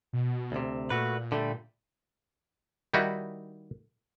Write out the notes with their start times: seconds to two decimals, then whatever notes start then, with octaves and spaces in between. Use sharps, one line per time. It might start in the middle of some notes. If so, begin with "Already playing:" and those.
0.13 B2
0.52 D2 C3
0.90 A#2 A3 F#4 B4
1.32 D3 G3 A3
2.94 D#3 G3 D#4 E4 F#4